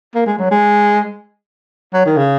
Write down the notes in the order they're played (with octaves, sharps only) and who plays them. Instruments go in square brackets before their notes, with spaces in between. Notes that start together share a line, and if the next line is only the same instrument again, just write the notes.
[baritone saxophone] A#3
G#3
F#3
G#3
F#3
D#3
C#3